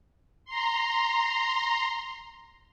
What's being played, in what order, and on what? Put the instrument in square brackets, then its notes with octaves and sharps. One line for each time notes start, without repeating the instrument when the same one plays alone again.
[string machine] A#5 C6